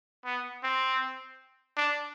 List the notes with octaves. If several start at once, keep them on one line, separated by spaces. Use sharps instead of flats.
B3
C4
D4